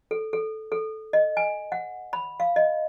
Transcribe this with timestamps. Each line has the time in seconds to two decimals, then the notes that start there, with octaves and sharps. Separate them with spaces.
0.11 A4
0.33 A4
0.72 A4
1.13 D#5
1.37 G#5
1.72 F#5
2.13 B5
2.40 F5
2.56 D#5